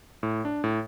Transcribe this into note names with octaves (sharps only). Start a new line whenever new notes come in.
A2
D4
A2